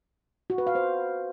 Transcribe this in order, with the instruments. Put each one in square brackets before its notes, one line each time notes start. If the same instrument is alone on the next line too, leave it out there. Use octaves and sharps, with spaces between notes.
[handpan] F#4
B4
F5
C5